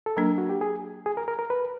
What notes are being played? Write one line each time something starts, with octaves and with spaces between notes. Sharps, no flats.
A4
F#3 A#3 D4 A#4
F#4
G4
G#4
G#4
A#4
A#4
A#4
B4